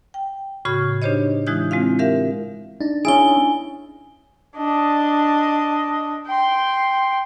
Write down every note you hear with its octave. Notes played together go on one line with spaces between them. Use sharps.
G5
A2 C#3 F#4 B5 F6 G#6
D4 D#4 G4 C5 C#5 D#5
E3 G#3 E4 D#6 F#6 G6
G#3 C4 F4 F5
G4 A#4 E5 F5
D4 D#4
C#4 E4 G#4 G#5 G7
D4 D#5
G5 C6